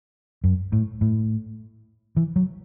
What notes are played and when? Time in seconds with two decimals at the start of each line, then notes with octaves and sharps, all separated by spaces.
0.44 F#2
0.72 A2
1.01 A2
2.17 E3
2.36 F#3